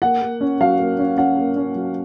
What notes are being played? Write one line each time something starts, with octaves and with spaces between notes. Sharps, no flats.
A#3 F#5
A#3
C#4
F#3 F5
A#3
C#4
C#4 F#5
A#3
C#4
F#3